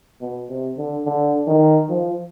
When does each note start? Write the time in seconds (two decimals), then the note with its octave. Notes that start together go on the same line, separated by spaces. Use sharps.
0.21 B2
0.49 C3
0.77 D3
1.05 D3
1.47 D#3
1.89 F3